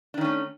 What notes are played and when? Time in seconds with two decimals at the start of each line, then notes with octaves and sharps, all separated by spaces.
0.14 D4
0.18 D#3
0.21 C#4
0.25 A3